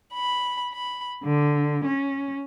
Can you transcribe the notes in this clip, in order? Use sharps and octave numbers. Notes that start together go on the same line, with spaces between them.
B5
B5
D3
C#4